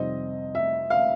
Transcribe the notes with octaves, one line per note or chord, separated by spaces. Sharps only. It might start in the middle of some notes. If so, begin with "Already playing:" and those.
Already playing: F2 C3 D#3 G3 C4 D#5
E5
F5